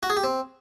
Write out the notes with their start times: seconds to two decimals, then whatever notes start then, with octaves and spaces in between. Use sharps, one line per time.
0.03 F#4
0.10 G#4
0.17 G4
0.24 C4